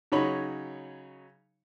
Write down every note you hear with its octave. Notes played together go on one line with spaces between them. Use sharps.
C#3 F#3 D#4 C#5 B5 C#6